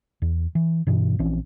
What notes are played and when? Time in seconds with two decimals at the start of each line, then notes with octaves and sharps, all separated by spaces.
0.22 E2
0.55 E3
0.87 G2 B2 E3
1.19 A#1 E3 C4 C#4